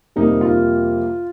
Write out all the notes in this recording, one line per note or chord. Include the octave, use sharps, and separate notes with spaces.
F2 C3 G3 A#3 D#4
F4